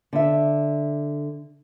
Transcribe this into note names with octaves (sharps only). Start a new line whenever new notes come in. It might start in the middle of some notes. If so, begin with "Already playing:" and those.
D3 E5